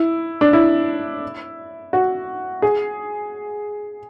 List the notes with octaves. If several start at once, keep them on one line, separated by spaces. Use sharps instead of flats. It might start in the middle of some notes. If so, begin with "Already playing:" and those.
Already playing: E4
D4
E4
F#4
G#4